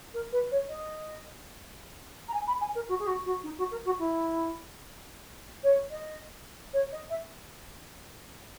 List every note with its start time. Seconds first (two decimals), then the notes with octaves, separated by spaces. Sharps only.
0.13 A#4
0.32 B4
0.51 C#5
0.68 D#5
2.28 A#5
2.33 G#5
2.47 B5
2.61 G#5
2.75 A#4
2.88 F#4
2.99 G#4
3.06 F#4
3.25 F#4
3.43 D#4
3.58 F#4
3.71 A#4
3.85 F#4
3.98 E4
5.63 C#5
5.90 D#5
6.73 C#5
6.92 D#5
7.09 E5